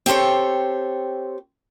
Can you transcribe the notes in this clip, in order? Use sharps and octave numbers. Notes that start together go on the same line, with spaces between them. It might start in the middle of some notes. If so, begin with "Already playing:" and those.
C4 G4 A4 C5 C#5